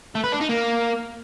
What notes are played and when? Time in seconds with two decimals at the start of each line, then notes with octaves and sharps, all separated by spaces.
0.15 A3
0.24 B4
0.32 D4
0.41 D#4
0.49 A#3